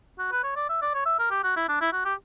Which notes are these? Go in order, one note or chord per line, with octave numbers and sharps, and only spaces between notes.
F#4
B4
C#5
D5
E5
D5
C#5
E5
A#4
G4
F#4
E4
D4
E4
F#4
G4